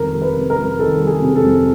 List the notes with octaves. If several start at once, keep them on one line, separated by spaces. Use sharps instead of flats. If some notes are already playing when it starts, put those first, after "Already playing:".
Already playing: F2 C3 D#3 G3 A4 A#4
G3
B4
C3
A#4
F2
D#3 A4
G3
G#4
C3
A4
F2